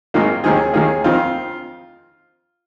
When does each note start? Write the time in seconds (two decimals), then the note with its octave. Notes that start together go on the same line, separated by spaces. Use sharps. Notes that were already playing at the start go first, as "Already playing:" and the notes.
0.14 G#1 G#2 D#3 A#3 F4
0.44 D#2 D#3 C4 G#4
0.73 D#2 D#3 A#3 G#4
1.04 F2 D#3 C4 F4